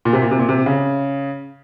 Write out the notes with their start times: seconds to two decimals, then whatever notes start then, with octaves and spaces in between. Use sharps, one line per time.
0.05 A#2
0.13 C3
0.22 A#2
0.31 C3
0.39 A#2
0.49 C3
0.66 C#3